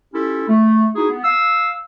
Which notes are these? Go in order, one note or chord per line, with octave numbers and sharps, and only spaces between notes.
C#4 E4 F4 G4 A4
A3
D#4 E4 F#4 G#4
B3
F5 E6